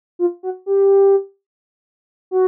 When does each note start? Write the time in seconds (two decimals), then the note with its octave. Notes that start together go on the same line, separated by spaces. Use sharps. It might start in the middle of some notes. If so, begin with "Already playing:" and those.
0.19 F4
0.43 F#4
0.66 G4
2.31 F#4